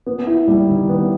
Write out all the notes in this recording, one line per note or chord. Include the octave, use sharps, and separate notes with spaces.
B3
E4
G3
D#3
B3